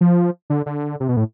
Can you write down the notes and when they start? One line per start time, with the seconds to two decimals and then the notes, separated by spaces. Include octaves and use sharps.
0.01 F3
0.50 D3
0.66 D3
1.00 C3
1.08 B2
1.17 A2